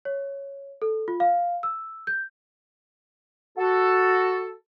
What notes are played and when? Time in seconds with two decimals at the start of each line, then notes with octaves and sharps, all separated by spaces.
0.05 C#5
0.82 A4
1.08 F4
1.20 F5
1.63 E6
2.07 G6
3.58 F#4 A4